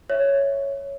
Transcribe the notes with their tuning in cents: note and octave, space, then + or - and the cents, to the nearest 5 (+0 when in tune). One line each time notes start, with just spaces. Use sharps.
C#5 +0 E5 +0